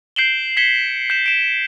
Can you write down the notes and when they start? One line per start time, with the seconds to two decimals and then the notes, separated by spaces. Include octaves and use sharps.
0.16 G6 C7 D7 E7 F#7 G7
0.57 G#6 B6 C#7 E7 G7
1.10 G6 E7
1.26 D7 E7